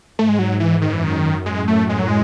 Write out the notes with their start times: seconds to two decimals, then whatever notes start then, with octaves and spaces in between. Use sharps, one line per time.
0.17 G#2 A3
0.29 G#3
0.39 F#3
0.60 E3
0.82 F#2 D#3
0.93 E3
1.04 D#3
1.46 A2 G#3
1.68 A3
1.89 G#3
1.99 F#3
2.08 G#3